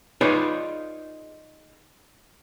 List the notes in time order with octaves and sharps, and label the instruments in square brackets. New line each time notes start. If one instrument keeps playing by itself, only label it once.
[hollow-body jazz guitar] D#4 F4 G#4 B4 C#5 D5